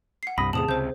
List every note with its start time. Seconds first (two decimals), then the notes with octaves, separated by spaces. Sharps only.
0.23 F#5 C7
0.38 C2 G2 B5 D#6 A#6
0.53 E2 A2 C3 G#4 A5 D#6 F#7
0.68 C#2 C3 C5 G6